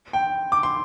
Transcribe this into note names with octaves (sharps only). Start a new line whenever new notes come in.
G5
D6
C6